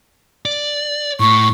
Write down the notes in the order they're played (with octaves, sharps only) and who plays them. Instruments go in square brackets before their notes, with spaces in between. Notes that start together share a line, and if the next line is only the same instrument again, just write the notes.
[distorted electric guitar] D5
[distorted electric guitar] A2 [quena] C#6